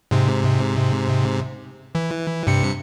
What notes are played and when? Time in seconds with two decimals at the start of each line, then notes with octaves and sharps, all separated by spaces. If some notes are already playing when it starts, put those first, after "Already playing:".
0.11 G#2 C3
1.95 E3
2.47 G2 C3 C#7